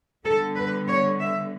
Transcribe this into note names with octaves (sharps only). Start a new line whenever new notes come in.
D3 G3 B3 A4
B4
C#5
E5